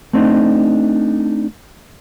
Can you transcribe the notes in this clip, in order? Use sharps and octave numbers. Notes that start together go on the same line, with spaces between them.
A3 C4 D4 D#4